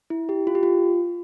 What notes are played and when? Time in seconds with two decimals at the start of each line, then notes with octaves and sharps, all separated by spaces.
0.10 E4
0.29 G4
0.47 F4
0.55 G4
0.63 F4